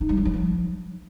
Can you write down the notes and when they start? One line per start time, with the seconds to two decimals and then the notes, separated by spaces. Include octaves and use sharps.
0.01 D#4
0.09 G3
0.17 D4
0.25 F#3
0.34 F3